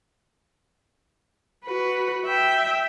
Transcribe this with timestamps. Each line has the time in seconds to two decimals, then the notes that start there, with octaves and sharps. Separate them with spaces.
1.65 F#4 B4
2.26 E5 G5